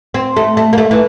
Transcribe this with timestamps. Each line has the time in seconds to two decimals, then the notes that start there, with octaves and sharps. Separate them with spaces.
0.14 C4
0.36 A3
0.57 A3
0.73 A#3
0.78 A3
0.91 E3